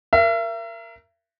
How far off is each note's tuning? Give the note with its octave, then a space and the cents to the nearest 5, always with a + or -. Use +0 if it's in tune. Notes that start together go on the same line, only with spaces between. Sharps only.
A#4 +0 E5 +40